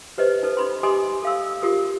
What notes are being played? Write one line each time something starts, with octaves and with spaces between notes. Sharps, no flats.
G4 B4 C5 D#5
D#4 A4 B4
D#4 B5 C6
G4 D#5 G#5 C6 D6 D#6
A4 F5 E6
F4 G4 A#4 D#6